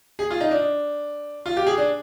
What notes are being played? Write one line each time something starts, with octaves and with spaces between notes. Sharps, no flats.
G#4
F4
D#4
D4
F4
G4
G#4
D4